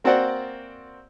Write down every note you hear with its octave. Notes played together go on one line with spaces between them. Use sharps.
A#3 C4 F#4 C5 D5 F#5